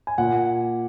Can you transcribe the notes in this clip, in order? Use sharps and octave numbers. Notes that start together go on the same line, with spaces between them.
G#5
A#2 F#5